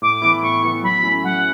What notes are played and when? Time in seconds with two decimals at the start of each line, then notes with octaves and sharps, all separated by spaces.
0.02 A2 D6
0.22 E3 B3 E4
0.42 A2 C#6
0.63 E3 B3 E4
0.83 F#3 B5
1.03 A3 C#4 E4
1.24 F#3 F#5